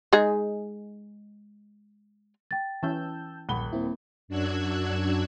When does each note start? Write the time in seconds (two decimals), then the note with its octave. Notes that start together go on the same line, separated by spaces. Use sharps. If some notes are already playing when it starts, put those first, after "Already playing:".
0.13 G#3 D#4 G#4
2.51 G5 A6
2.83 E3 C#4 A5 E6 G6
3.49 D#1 A#1 F#5 B5 G7
3.73 A#3 C4 E4
4.28 F#2 D4 F#4 E6 F#6 G#6